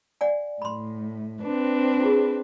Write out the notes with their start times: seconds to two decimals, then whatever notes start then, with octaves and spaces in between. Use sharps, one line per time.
0.21 D5 F#5 G#5
0.62 A2 B5 C6
1.42 C4 D4 B4
2.01 F4 G#4